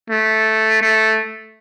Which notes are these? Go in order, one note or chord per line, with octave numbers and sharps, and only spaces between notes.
A3
A3